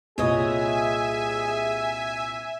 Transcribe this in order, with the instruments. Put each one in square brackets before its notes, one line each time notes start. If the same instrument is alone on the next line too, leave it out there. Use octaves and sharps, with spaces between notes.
[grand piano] C2 A#2 [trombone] G#4 [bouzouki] B4 C#5 D#5 [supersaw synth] E5 G#5